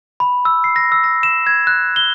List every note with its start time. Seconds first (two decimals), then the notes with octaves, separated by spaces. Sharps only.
0.20 B5
0.45 E6
0.64 C7
0.76 A#6
0.92 E6
1.04 A#6
1.23 E7
1.47 G#6
1.67 F#6
1.96 G7